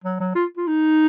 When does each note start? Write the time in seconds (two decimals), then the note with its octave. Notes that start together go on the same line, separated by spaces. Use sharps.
0.04 F#3
0.20 F#3
0.35 F4
0.57 F4
0.67 D#4